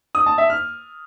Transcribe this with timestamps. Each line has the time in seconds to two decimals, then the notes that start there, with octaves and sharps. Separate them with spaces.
0.15 D#6
0.26 A5
0.38 E5
0.50 F6